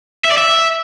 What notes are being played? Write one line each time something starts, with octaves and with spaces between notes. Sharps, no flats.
E5
D5
E5